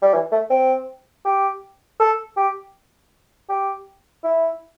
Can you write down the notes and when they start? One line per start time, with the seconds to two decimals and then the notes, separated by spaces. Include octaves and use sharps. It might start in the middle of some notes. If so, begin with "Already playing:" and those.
0.02 G3
0.13 E3
0.32 A3
0.50 C4
1.25 G4
2.00 A4
2.37 G4
3.49 G4
4.24 E4